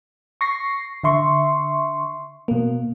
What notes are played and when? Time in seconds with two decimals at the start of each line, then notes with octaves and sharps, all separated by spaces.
0.41 C#6 A#6 C7
1.03 D3 E5 C6 C#6
2.48 B2 A#3